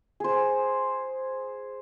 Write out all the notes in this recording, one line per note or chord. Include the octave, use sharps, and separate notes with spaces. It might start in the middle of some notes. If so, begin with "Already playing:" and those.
G#4 C5